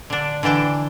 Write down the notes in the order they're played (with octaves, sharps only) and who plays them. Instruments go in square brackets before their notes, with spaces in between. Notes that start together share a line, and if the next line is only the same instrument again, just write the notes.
[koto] D3 D4
D3 E3 D4 G5 A5